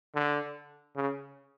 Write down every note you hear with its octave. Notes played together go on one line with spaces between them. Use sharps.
D3
C#3